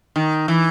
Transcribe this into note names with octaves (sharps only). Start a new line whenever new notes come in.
D#3
E3